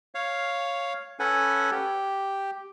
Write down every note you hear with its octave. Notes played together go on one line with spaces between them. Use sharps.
C#5 F5
C#4 A4 B4 F#5 G#5
G4